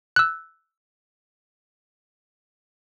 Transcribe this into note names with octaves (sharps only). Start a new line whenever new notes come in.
E6 F#6